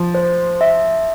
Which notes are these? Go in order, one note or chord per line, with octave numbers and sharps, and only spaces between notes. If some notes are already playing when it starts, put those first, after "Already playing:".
Already playing: F3
C5
E5